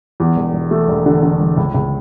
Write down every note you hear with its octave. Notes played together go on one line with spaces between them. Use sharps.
E2
E1
E1
A3
E1
D3
D3
E1
C#2
C#2